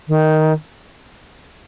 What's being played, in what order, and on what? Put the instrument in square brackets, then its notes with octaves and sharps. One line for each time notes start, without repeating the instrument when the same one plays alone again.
[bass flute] D#3